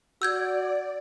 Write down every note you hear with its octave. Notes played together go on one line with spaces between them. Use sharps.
F#4 D5 E6 G6 G#6